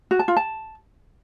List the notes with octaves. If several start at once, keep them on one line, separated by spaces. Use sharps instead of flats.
F#4
A5
F4
A5